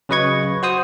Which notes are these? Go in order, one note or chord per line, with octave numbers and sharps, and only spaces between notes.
C#3 F#3 B4 D#5 C#6 G#6
F#4 C5 D#6